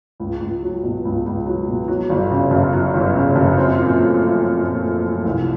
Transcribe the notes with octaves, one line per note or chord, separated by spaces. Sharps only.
C#2
C#2
F#3
B2
C#2
C#2
F#3
B2
F#3
G1
C#3
F#2
F#3
G1
C#3
F#2
C4
A#2
A3
F3
C4
A#2
A3
F3
C2